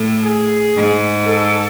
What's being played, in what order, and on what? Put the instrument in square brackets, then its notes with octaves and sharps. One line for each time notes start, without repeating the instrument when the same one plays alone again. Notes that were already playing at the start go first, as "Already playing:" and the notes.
Already playing: [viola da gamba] A2
[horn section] G#4
[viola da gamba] G#2
[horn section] A4